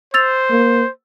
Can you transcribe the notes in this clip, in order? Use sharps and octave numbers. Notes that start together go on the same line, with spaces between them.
C5 E6 A6 F7
A#3